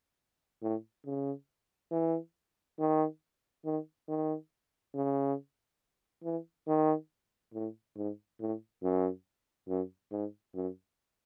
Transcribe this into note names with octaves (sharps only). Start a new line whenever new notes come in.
A2
C#3
E3
D#3
D#3
D#3
C#3
E3
D#3
A2
G#2
A2
F#2
F#2
G#2
F#2